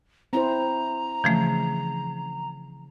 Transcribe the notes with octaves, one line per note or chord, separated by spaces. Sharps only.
C4 E4 C5 A#5
C#3 E3 F3 A3